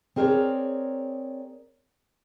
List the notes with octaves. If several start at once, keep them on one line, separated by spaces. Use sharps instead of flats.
C4 G#4 A#4 B4 C#5 D5